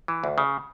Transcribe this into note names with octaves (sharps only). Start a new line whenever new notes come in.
E3
D2
C#3